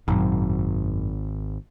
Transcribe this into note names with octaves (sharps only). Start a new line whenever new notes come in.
G#1 F#2 A#2